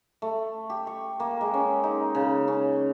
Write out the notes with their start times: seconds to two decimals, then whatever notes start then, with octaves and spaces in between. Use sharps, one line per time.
0.22 A3
0.70 G4
0.87 C#6
1.20 A#3
1.41 G#3
1.54 C#4
1.84 D#4
2.15 C#3
2.48 C#4